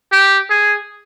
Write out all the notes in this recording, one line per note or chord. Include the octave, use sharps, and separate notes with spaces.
G4
G#4